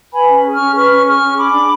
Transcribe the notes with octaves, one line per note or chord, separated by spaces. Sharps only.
B4 G#5 B5
C#4
G#4
C#6 F6
C#4
B4 C#6 F6
C#4
G#4 C#6 F6
C#4
G#4 B5 D6
D4